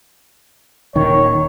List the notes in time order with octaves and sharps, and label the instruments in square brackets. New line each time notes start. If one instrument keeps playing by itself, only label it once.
[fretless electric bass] D#1 D#3 [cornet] C#5